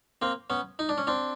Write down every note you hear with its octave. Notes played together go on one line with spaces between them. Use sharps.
A#3 C4
B3 C#4
D#4
D4
C#4
C4 D4